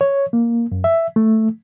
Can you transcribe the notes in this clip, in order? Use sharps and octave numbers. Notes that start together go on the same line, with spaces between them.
C#5
A#3
F#2
E5
A3